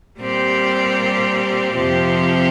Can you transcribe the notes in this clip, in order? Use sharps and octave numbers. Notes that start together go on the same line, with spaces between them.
A#2 G3 C4 G4
F2 C3 F3 C4 G4